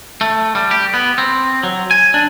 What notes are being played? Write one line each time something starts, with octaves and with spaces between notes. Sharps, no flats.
A3
G3
G4
B3
C4
F#3
G#5
D4